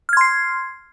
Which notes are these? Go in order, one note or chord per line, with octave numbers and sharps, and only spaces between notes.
C6 F6 G#6 C7